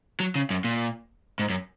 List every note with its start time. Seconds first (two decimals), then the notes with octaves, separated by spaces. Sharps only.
0.20 F#3
0.35 C#3
0.50 F#2
0.64 A#2
1.39 G#2
1.50 F#2